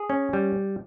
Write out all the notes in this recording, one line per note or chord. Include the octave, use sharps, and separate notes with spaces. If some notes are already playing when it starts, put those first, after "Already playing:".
Already playing: G#4
C#4
G3